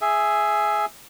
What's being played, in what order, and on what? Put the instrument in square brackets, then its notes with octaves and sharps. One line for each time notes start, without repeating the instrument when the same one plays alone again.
[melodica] G#4 E5